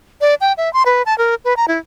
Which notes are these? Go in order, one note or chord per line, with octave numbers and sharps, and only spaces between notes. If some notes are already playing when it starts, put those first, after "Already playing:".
D5
G5
E5
C6
B4
A5
A#4
B4
A#5
E4